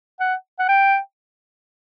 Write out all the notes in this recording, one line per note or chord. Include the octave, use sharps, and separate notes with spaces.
F#5
F#5
G5